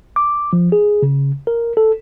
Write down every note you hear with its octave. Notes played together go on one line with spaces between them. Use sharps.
D6
F3
G#4
C#3
A#4
A4